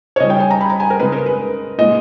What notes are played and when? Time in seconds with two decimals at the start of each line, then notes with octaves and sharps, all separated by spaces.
0.16 C#5
0.20 C#3 G3 D#5
0.30 G5
0.40 G#5
0.51 A#5
0.61 B5
0.70 A#5
0.80 G#5
0.90 A#4
1.00 C#3 G#3 B4
1.12 A#4
1.26 B4
1.78 A#2 G#3 D#5